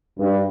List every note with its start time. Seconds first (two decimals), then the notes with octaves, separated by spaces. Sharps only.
0.19 G2